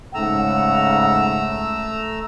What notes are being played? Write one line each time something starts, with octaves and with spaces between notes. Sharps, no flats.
G#2 C#3 A3 F#5 A#5 E6